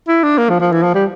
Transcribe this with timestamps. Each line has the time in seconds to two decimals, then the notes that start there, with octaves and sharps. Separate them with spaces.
0.08 E4
0.23 D4
0.38 A#3
0.49 F3
0.60 F3
0.72 E3
0.83 F3
0.94 G3